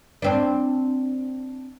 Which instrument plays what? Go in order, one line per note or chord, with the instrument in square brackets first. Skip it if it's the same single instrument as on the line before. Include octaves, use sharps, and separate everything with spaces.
[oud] C4 D4